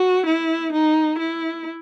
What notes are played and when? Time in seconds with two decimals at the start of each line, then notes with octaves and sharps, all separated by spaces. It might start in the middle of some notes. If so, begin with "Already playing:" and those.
Already playing: F#4
0.26 E4
0.73 D#4
1.19 E4